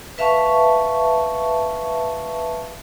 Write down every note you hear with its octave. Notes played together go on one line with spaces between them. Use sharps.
B4 E5 F5 A5 C#6